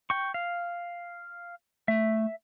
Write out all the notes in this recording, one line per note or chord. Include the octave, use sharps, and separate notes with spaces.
G5 C#6
F5
A3 E5